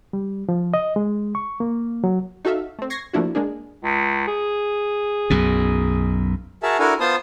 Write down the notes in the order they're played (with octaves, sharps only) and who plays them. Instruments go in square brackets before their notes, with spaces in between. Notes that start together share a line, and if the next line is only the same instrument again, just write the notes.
[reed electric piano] G3
F3
D#5
G#3
C#6
A#3
F#3
[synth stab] D#4 F#4 A4 E5 F5
A3 C4
C#6 G#6 A#6 C7
F3 A3 A#3 D4 E4 F#4
G#3 A#3 D4 G#4
[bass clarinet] C#2
G#4
[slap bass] B1 F#2 B2
[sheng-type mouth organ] F#4 G#4 A#4 E5 A5
D4 E4 F#4 A4 A#4 G#5
B3 F4 C5 A5 C6 D#6